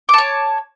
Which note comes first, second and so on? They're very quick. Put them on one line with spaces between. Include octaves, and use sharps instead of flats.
D6 A5 C#5